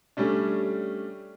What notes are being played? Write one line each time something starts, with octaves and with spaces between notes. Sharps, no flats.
G3 A3 C#4 D4